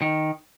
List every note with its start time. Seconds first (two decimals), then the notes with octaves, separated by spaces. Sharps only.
0.02 D#3